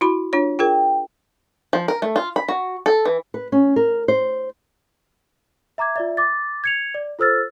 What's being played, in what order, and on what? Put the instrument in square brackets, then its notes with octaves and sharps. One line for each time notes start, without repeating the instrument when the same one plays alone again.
[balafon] E4 F#4 B5
D4 F4 C#5
[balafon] F4 G#4 A#4 [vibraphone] G5
[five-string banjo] F3
A#4
A3
F4
B5
F#4
A4
E3
[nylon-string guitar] B4
C#4
A#4
C5
[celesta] E5 A#5 D6 G#6
F4 D5 E5
D6 A6
G#6 C#7 F7
D5
F4 A4 C5 E6 F6 A6